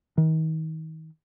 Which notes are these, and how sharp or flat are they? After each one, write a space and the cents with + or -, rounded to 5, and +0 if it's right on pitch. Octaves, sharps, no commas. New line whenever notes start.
D#3 +35